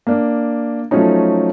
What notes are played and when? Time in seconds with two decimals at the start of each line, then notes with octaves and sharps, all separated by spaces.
0.07 A#3 D4
0.91 F3 F#3 A3 C#4 D#4